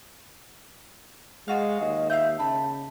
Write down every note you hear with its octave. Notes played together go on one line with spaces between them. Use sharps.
G#3 F4 F#4 F5
D#2 D#5
E5 F5 G6
C#3 A5 B5